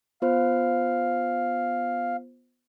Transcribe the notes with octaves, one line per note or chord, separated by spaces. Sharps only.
B3 F4 C5 F5